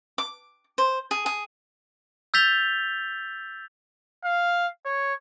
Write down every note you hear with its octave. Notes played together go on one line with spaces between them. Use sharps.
D6
C5
G#4
G#4
E6 G6 A6 B6 F7 G7
F5
C#5